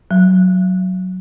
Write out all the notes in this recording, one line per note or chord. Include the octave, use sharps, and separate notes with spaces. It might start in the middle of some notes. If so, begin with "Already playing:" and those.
F#3